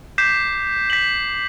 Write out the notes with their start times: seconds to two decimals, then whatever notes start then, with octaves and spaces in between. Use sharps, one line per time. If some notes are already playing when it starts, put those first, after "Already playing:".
0.18 D6 G6 B6 C7 E7
0.90 B6 F#7